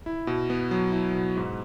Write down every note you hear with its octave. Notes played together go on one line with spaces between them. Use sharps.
E4
B2
B3
F#3
E4
B2
G#2